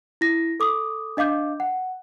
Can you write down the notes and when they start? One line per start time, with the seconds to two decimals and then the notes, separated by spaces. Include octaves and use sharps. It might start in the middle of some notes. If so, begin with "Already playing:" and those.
0.21 E4 A#6
0.60 A4 D6 D#6
1.17 D4 D#5 F5 D6 G6
1.60 F#5